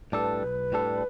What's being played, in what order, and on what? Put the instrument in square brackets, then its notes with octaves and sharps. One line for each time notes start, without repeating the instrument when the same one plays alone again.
[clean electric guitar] A2 G3 D4 A4 [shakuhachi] B4
[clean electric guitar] B1
A2 G3 D4 A4